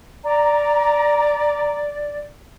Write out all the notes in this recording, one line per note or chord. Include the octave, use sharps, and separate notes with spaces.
D5 A#5